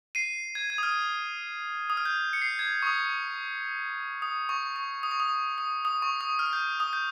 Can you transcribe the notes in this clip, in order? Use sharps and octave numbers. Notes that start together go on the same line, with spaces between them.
C7 D#7
G#6
G#6
D#6
F6
D#6
F6
G6
C#7
C7
G#6
C#6
D#6
D#6
C#6
C#6
D#6
C#6
D#6
D#6
D#6
C#6
D#6
F6
G6
D#6
G6